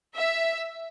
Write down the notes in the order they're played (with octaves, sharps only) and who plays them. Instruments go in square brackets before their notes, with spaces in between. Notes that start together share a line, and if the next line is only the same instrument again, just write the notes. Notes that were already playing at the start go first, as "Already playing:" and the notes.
[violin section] E5